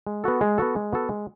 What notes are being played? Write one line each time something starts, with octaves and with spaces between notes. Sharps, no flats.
G#3
B3 F#4 A4
G#3
B3 F#4 A4
G#3
B3 F#4 A4
G#3